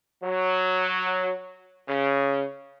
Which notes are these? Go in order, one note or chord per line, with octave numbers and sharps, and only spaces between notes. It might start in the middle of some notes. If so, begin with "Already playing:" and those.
F#3
C#3